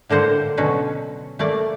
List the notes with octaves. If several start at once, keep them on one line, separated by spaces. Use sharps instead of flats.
A2 D3 A#3 C5 F#5
B2 D3 F#3 C#4
A3 A#3 D5